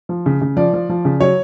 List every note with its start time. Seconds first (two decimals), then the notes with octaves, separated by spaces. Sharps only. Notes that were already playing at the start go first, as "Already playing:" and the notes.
0.09 F3
0.26 C#3
0.41 C#3
0.57 F3 D5
0.73 F3
0.89 F3
1.05 C#3
1.21 F#3 C#5